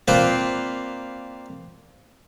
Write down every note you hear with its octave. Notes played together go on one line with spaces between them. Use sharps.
A#3 C4 F4 B4 C5 D5